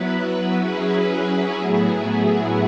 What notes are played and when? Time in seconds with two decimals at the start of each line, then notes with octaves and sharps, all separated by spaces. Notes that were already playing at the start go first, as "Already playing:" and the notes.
Already playing: F#3 B3 E4 B4
0.58 F#3 C#4 E4 G#4 B4
1.58 A2 F#3 B3 E4 G#4